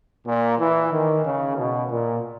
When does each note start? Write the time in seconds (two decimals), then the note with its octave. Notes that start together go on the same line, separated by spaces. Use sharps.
0.26 A#2
0.58 E3
0.91 D#3
1.24 C#3
1.56 B2
1.89 A#2